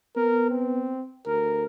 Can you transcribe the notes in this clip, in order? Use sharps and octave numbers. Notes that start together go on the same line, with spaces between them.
B3 A#4
C4
D2 A#4